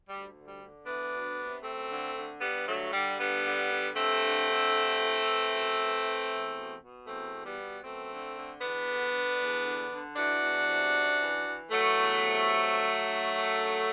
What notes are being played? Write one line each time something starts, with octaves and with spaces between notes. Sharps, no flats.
D2 G3
D3
G3
D3
E3 B3 D4
D2
C3
F#2 A3 C4
D3
D3
G2 G3 B3
D3 F#3 A3
D3 G3
G2 G3 B3
D3
D3
G2 A3 C4
D3
D3
G2
E3
E3
F#2
E3
E3
E2
B2
B2
E2 A3 C4
B2
G3 B3
B2
F#2 A3 C4
D3
D3
E2 B3 D4
D3
D3
E2
D3
D3
E3 D4 F#4
E2
C3
F#2
E3
E3
E3 F#3 A3
E2
C3
G2
D3
D3
F#2
D3